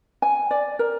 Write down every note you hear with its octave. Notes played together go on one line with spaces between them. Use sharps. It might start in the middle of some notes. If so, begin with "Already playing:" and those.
G#5
D5
A#4